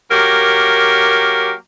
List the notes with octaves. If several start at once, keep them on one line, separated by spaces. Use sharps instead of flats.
F#3 A#3 G4 A#4